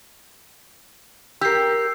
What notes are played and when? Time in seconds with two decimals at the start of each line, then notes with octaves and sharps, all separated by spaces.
1.41 G4 A#4 E6 C7